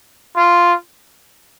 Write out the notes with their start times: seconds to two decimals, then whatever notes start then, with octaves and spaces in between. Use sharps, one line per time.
0.36 F4